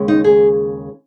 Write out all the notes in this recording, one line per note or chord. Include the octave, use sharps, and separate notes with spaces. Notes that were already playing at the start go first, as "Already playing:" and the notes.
Already playing: D#2 C#3 G#3
D#4
G#4